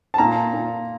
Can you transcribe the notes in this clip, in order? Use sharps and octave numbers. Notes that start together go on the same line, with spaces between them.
A5
A#2 A#5
A#2